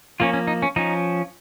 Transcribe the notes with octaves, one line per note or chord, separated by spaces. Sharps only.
F3 A#3 C#4 F4
C#4
D#4
C#4
F3 C#4 D#4